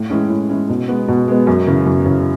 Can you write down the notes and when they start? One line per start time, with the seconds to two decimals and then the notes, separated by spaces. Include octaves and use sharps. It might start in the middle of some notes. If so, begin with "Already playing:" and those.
Already playing: A2
0.10 E3 G#3 C#4
0.30 A2
0.49 E3 G#3 C#4
0.69 B2
0.88 G#3 B3
1.08 B2
1.28 G#3 B3
1.47 F#2
1.67 C#3 E3
1.86 F#2
2.06 C#3 E3